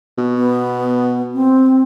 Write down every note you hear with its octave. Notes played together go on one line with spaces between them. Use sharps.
B2
B3
C4